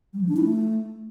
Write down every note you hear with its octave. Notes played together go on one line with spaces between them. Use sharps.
G3
F3
D4
E4
A3